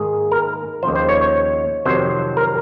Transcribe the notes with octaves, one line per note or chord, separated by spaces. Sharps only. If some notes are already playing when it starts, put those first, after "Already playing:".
Already playing: G#2 D#3 A#3 G#4
A#4
D#2 C#3 F3 C5
C5
C#5
C#5
F2 C3 D#3 F#3 C5
A#4